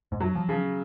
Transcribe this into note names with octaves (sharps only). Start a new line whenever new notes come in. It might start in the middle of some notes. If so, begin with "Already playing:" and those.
G#2
F#2 F#3
F3
C#3 F3